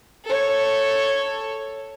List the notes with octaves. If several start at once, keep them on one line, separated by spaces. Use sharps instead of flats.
A4 C#5